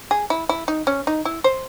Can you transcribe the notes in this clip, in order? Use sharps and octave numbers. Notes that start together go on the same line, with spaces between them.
G#4
E4
E4
D#4
C#4
D#4
E4
C5